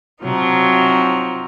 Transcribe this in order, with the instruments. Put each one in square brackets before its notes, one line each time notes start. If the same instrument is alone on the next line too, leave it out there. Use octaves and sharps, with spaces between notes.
[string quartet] C3 F3 F#3 D#4